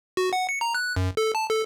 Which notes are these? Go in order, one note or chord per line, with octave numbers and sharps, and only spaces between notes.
F#4
F#5
C#7
A#5
F#6
F#2
A4
A5
A4